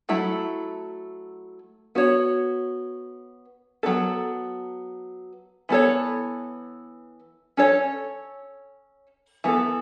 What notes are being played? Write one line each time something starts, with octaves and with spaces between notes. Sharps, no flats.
F#3 A3 E4
B3 F#4 C#5
F#3 B3 A4
E3 B3 E4 A4 C#5
C#4 A4 C#5
E3 B3 A4